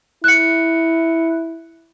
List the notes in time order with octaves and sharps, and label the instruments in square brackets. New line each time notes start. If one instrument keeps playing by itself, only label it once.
[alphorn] E4 [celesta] F#6 C#7